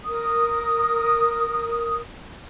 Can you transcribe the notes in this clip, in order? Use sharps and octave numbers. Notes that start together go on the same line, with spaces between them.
A#4 D#6